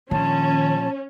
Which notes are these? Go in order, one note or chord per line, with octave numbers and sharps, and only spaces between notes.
A#2 D#3 F3 C#4 A5